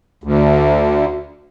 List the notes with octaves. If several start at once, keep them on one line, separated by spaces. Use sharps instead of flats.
D2